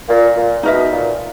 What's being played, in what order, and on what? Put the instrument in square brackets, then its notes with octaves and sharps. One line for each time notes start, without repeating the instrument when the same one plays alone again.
[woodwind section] A#2
A#2
[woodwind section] B2 [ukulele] D#4 A#4 E5
[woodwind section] A#2